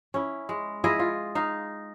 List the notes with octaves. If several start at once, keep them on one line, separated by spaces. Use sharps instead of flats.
C#4 E4
G#3
E4 F4 G#4 D#5
F4
D#4 F5